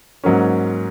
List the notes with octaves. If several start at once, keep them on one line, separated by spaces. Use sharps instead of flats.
G#2 F#3 A#3 C#4